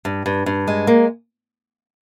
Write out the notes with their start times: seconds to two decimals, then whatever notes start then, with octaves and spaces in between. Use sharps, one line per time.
0.05 G2
0.26 G2
0.46 G2
0.67 G#3
0.87 A#3